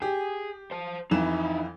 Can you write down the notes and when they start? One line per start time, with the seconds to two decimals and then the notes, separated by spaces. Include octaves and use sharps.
0.02 G4 G#4
0.71 C5 A5
1.11 F2 E3 D#4 E4 E7